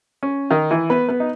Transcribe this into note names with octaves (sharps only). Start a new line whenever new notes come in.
C#4
D#3 D#4
E3 E4
B3 B4
B3 B4
D#4